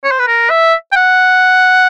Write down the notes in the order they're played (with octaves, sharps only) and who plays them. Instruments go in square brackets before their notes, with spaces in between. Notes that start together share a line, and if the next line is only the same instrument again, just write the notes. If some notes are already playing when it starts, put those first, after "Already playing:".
[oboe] C#5
C5
B4
A#4
E5
G5
F#5